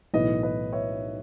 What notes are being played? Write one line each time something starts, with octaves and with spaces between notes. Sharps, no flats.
B1 A2 E3 B3 B4 D#5
B4 D#5
C#5 E5